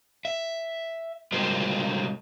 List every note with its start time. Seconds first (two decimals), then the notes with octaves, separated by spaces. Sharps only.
0.25 E5
1.32 C3 G3 G#3 F#4 A#4 C5